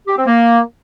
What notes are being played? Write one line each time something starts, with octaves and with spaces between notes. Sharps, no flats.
G4
C4
A#3